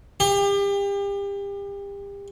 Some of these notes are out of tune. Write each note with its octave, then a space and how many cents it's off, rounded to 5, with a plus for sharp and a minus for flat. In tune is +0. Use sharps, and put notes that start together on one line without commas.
G4 +35